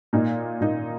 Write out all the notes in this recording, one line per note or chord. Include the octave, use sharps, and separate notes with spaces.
A#2 A#3 D#4
A#2 A#3 D#4